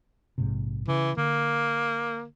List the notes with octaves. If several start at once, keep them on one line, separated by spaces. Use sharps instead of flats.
A#1 G#2 C3
C#3 E3
D3 A#3